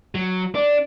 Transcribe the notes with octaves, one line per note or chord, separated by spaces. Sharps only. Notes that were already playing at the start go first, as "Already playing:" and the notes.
F#3
D4